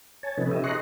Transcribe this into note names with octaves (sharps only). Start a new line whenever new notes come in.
C#5 G#5 A5
C3 F3 C#4 D#4 A4 B4
G4 D#5 E5
G#4 D#5 A#5 C6 C#6 F#6